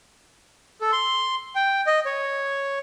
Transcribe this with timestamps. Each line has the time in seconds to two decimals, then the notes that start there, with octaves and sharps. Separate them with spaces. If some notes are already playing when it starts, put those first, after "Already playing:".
0.81 A4
0.92 C6
1.55 G5
1.87 D#5
2.06 C#5